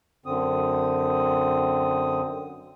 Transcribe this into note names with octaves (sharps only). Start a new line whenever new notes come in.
F#2 D3 C4 D#6